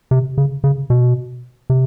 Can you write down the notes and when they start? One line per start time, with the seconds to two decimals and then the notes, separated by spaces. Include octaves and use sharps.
0.11 C3
0.38 C#3
0.64 C#3
0.90 B2
1.70 C3